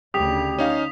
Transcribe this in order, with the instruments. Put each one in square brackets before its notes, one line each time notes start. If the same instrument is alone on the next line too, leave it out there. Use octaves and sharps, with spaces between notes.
[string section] D2 C#3 [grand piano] G4 [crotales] D#6 B6 F7
[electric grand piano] C#4 D#4 F5